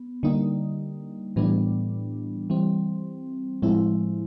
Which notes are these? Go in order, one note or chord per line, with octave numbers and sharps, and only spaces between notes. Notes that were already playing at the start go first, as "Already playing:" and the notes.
Already playing: B3
D3 G3 A#3 D#4
A2 E3 G3 B3 D4
E3 G3 C4
A2 F3 G#3 C4 E4